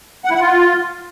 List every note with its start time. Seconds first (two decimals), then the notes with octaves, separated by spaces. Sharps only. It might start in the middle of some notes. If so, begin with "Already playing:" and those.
0.25 F#5
0.30 E4
0.35 F#5
0.41 F4